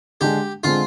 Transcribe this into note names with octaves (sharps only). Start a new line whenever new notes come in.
D3 G#3 D4 G4
D3 G#3 C4 F4